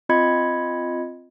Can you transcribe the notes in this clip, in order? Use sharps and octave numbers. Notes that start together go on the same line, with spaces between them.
C4 F4 D#5 B5 G#6 C#7